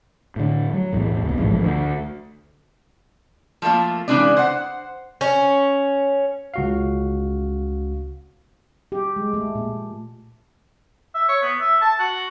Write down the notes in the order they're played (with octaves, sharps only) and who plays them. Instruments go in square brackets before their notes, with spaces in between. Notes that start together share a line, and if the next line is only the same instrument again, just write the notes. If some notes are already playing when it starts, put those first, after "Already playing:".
[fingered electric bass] A2 D3
F#3
B1 E2 A2
C#2 B2
A1 G#2 C#3 F3
D2
[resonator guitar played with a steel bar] F3 A3 A#3 F4
C#3 E3 G#3 D4 D5
C5 F#5
[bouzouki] C#4
[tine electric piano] C#2 F#4 F5
[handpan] G4
G#3
A3
A#2
[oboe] E5
C#5
B3
E5
A5
F#4